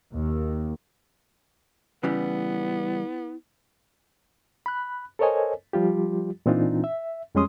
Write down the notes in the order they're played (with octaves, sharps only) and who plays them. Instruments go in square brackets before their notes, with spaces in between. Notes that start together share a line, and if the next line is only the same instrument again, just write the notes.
[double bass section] D#2
[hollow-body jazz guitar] C#3 E3 G3 [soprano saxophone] B3 [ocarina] E4
[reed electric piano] B5 F#6
A4 A#4 C5 C#5 D#5 G#5
F3 G3 F4 G4
A#2 E3 C4 D4 D#4 F4
E5
F2 G3 G#3 C#4 C6 D#6